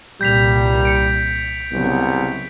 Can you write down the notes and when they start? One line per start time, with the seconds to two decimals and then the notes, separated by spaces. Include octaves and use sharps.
0.21 C2 A#2 G3 G6 B6 F7
0.85 C#7 D7
1.72 C2 C#3 F#3 B3